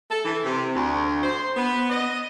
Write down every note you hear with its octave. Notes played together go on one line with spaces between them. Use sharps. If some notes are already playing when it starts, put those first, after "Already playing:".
A4
E3
C3
D2
C5
B3
D#5